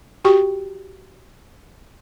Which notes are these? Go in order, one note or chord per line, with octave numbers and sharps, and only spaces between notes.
F#4 G4 G5 C#6